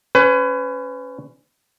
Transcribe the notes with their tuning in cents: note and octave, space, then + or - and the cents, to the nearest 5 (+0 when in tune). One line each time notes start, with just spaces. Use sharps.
C#4 +0 B4 +30